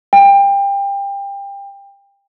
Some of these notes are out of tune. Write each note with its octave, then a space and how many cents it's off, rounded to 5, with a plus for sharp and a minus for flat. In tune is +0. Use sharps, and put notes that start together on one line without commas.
G5 +25